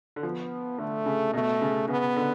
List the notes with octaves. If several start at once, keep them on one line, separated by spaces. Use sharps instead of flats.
D3
F3 B3
D3 A3
C#3
B2 A3
C#3
C#3 B3
D3